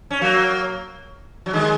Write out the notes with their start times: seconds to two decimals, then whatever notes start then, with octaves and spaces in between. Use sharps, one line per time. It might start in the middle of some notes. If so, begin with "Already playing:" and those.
0.10 C#4
0.21 F#3 A#3
1.46 F#3
1.53 D#3 G#3